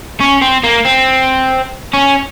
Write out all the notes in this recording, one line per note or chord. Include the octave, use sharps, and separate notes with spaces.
C#4
C4
A#3
C4
C#4